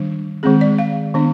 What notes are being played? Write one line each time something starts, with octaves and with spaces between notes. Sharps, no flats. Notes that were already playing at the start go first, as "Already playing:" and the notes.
Already playing: D#3 G3 D4
D#3 G#3 C4 G#4
D5
F5
D#3 B3 D4